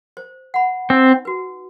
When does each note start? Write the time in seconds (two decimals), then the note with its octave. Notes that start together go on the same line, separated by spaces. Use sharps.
0.17 C5
0.54 F#5 B5
0.90 C4 D#4
1.25 F#4 B4